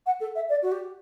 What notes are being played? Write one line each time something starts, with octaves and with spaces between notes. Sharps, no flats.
F#5
A4
E5
D5
F#4
G4